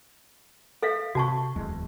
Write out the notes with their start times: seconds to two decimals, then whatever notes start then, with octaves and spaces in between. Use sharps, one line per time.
0.82 A4 E5 F5
1.15 C3 F#4 A5 C#6
1.56 D1 E2 G#3